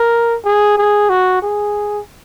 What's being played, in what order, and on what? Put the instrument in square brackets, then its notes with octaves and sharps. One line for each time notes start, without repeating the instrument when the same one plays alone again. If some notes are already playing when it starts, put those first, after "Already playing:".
Already playing: [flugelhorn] A#4
G#4
G#4
F#4
G#4